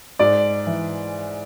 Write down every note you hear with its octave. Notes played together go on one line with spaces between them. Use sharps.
G#2 D5
E3